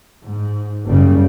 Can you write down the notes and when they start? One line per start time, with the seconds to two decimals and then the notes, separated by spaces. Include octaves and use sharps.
0.24 G#2
0.85 F#1 F#2 C#3 G3